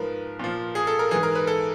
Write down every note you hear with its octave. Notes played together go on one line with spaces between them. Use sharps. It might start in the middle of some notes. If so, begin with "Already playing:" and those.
Already playing: G#2 F3 A#4 B4
A#2 F3
G#4
A4
A#4
G#2 E3 G#4
A#4
B4
A4